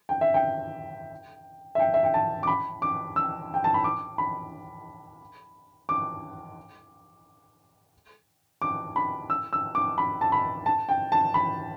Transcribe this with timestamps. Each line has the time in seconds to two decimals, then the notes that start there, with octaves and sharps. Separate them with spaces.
0.09 G5
0.21 E5
0.34 G5
1.75 E5
1.79 G5
1.94 E5
2.04 G5
2.14 A5
2.43 D6
2.47 B5
2.82 D6
3.16 E6
3.54 G5
3.64 A5
3.74 B5
3.84 D6
4.18 B5
5.89 D6
8.62 D6
8.96 B5
9.30 E6
9.53 E6
9.75 D6
9.98 B5
10.21 A5
10.32 B5
10.66 A5
10.89 G5
11.12 A5
11.34 B5